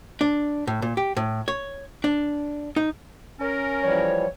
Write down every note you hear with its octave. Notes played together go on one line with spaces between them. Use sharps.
D4
A2
A#2
G4
A2
C#5
D4
D#4
C#4 A#4
E3 F3 G3 C#5